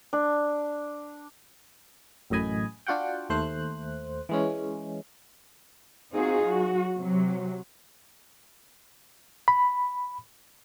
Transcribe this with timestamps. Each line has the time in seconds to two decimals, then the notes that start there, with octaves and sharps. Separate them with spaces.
0.13 D4
2.30 A1 F#2 A2 D#5 G#5 B5
2.87 D4 F4 F#4 F#5 G5
3.29 D#2 A3 C5 F#6
4.29 E3 G#3 C#4
6.14 C4 D#4 F4 F#4 G#4
6.45 F#3 F#4
6.99 C3 F#3
9.48 B5